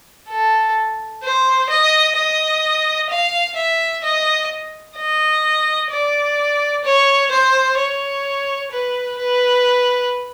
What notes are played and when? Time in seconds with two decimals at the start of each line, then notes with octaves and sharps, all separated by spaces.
0.30 A4
1.23 C5
1.70 D#5
2.16 D#5
3.10 F5
3.56 E5
4.04 D#5
4.97 D#5
5.91 D5
6.84 C#5
7.31 C5
7.78 C#5
8.72 B4
9.18 B4